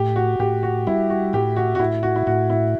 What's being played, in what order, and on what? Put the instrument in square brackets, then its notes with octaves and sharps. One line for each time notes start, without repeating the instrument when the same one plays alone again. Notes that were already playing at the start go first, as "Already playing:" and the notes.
Already playing: [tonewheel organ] A2 [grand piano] G4
[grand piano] F#4
[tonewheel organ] A2 [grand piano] G4
[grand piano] F#4
[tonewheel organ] G3 [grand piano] E4
[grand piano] F#4
[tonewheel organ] A2 [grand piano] G4
[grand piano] F#4
F#4
[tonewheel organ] A2 [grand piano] E4
[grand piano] F#4
E4
[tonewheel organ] A2 [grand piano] F#4
[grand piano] E4